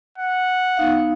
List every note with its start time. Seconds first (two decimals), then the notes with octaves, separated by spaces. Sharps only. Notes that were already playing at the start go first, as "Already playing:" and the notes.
0.18 F#5
0.77 B3 D#4 F5